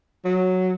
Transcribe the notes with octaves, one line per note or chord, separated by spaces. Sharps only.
F#3